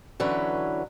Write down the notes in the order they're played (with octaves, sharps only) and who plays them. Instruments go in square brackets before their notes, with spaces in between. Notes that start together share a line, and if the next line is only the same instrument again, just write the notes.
[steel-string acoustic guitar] D3 E3 F#3 C#4 B4